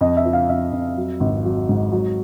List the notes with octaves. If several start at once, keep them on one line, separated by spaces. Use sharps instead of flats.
F2 D#5
E5
F3
F5
F2 E5
F2
F#3
G#1
F#3
G#2
F#3